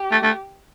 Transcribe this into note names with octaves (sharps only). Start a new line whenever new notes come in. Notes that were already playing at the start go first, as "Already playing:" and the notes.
Already playing: G4
A3
A3